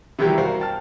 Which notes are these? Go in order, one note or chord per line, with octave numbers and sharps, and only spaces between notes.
C3 D#3 E3 F#3 G3 G4
F#4 A#4 C5 F5
G5 A5 F6